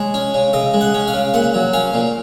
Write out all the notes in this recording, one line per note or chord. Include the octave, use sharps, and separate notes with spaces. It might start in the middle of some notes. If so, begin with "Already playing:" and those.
Already playing: G#3 C#5
C#4
C#3
C#3 D#5
G#3
F#5
C#4
F5
C#3
A#2 F#5
F#3
C#4 F5
A#2